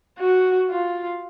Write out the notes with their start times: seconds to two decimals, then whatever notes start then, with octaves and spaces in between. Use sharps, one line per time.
0.19 F#4
0.70 F4